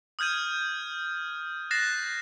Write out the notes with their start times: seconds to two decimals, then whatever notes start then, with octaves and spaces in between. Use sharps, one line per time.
0.19 D#6 F6 G6 G#6 D#7
1.71 F#6 A6 A#6 C7 E7